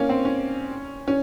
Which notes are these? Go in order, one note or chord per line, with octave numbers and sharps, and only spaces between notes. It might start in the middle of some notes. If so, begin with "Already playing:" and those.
Already playing: A#3 C#4
C4
C#4
C#4